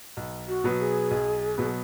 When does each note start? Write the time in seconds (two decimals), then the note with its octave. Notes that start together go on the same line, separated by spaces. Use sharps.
0.17 B1
0.48 F#4
0.64 B2 F#3 B3
0.80 G#4
1.11 B1
1.58 B2 F#3 B3